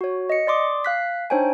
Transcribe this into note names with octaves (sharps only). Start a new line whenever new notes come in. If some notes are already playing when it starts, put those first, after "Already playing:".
F#4 C#5
D#5 C#7
D5 C6 D6 D#6
F5 F#6 B6
D4 D#4 C5 C#5 G5 G#5